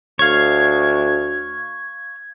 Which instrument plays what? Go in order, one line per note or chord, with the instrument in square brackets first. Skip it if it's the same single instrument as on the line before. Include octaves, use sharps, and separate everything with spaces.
[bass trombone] D2 [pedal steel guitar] C#5 F5 [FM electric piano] G#6